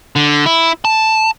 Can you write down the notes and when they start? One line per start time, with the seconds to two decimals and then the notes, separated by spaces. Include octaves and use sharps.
0.16 D3
0.46 E4
0.85 A5